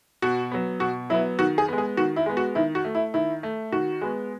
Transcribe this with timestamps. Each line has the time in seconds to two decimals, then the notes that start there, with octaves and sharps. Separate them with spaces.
0.22 B2 F#4
0.52 F#3 B3
0.80 B2 F#4
1.10 F#3 B3 E4
1.39 D#3 F#4
1.58 G#4
1.68 G#3 B3
1.78 G#4
1.97 D#3 F#4
2.16 E4
2.26 G#3 B3
2.37 F#4
2.55 D#3 E4
2.75 F#4
2.85 A3
2.95 E4
3.14 D#3 E4
3.43 A3
3.72 D#3 F#4
4.01 G#3 B3